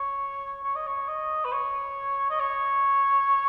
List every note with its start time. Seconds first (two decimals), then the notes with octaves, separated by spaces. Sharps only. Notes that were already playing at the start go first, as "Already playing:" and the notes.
Already playing: C#5
0.64 C#5
0.76 D#5
0.87 C#5
1.08 D#5
1.45 B4
1.52 C#5
2.30 D#5
2.40 C#5